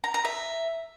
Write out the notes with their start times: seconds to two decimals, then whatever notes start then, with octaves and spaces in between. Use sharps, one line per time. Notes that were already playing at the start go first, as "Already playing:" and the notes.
0.04 A#5
0.14 A#5
0.25 E5